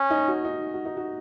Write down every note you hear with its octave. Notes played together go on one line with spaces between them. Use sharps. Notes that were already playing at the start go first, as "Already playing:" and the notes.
Already playing: C#4
D#4
F#4
D#4
F#4
D#4
F#4